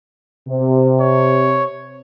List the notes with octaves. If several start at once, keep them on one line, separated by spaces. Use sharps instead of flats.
C3
C#5